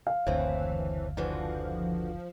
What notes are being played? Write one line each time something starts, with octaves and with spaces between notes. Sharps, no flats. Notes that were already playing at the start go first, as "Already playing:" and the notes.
F5
F#1 D2 A2 E3 C4
D3 E3 F3 F#4